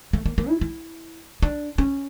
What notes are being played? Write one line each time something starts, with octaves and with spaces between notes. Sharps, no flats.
A3
A#3
A#3
E4
E4
D4
C#4